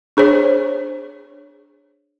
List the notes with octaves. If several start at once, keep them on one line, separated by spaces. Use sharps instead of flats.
D4 G#4 C5 C#5